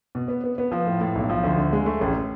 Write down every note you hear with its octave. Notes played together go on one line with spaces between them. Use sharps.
B2
B3
B3
B3
F3
A2
A2
B1
F3
D2
D3
G#3
A3
A1